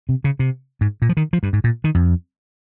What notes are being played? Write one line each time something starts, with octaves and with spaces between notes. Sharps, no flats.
C3
C#3
C3
G#2
A#2
F3
D#3
F3
G2
G#2
A#2
D#3
F2